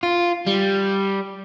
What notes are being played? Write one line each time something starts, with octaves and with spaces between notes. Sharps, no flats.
F4
G3